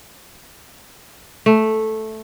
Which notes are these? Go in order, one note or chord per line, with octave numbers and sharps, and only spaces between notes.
A3